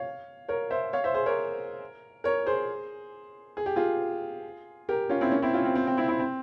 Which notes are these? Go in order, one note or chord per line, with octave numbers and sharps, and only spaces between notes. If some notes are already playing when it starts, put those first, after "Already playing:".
Already playing: C#5 F5
A#4 C#5
C5 E5
C#5 F5
C5 E5
G#4 C5
A#4 C#5
A#4 C#5
G#4 C5
G#4
G4
F4 G#4
G4 A#4
C#4 F4
C4 E4
A#3 C#4
C4 E4
C#4 F4
C4
C4
C4
C4 E4
C4 E4
C4